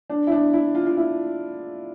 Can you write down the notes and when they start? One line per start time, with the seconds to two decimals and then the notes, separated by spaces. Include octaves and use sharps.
0.10 D4
0.27 E4
0.32 D4
0.54 E4
0.75 F4
0.86 F4
0.97 E4